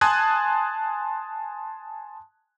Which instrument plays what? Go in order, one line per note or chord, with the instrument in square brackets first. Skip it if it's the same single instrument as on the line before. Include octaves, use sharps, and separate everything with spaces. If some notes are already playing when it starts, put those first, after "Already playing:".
[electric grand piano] G#5 A5 C6 D#6 F#6 G#6